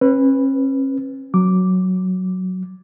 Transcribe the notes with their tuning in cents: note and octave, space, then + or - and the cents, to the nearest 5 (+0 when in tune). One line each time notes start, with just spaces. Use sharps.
C#4 -40 B4 +0
F#3 +0 D6 +0